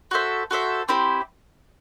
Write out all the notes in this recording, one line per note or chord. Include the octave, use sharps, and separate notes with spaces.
F#4 A4 C5 E5
F#4 A4 C5 E5
C4 E4 G4 C5